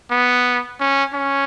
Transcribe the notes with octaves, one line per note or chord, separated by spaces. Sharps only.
B3
C#4
C#4